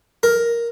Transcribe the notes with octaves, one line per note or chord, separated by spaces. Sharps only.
A#4